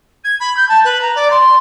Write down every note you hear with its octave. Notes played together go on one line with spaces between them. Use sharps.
G#6
B5
G6
A5
B4
A#5
D5
C6